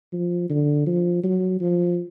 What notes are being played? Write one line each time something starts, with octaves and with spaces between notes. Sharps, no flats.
F3
D3
F3
F#3
F3